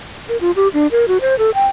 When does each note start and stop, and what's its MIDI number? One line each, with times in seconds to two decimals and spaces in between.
0.29 0.37 70
0.41 0.51 65
0.56 0.68 67
0.74 0.87 62
0.91 1.05 70
1.08 1.18 66
1.21 1.37 72
1.39 1.50 69
1.54 1.67 79